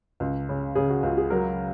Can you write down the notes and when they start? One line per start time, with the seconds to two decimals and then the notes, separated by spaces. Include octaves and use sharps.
0.20 C#2
0.49 C#3
0.75 C#3 G#4
0.90 F#4
1.03 C#2 F4
1.17 G#4
1.30 F#3 A#4